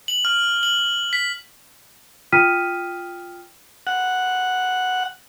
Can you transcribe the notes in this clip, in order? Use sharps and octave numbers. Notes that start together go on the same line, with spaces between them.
F#7
F6
F#7
B6
F4 G5 D#6 F6 B6 D#7
F#5